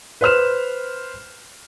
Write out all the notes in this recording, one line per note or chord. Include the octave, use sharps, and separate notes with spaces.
B4 C5 F6 E7